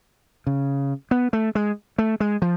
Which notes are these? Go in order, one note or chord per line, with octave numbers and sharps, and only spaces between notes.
C#3
B3
A3
G#3
A3
G#3
F3